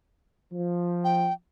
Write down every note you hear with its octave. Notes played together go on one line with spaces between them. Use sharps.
F3
G5